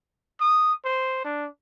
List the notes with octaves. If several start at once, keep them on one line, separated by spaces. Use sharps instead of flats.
D#6
C5
D4